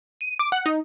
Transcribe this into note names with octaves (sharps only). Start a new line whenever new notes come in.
D#7
D6
F#5
D#4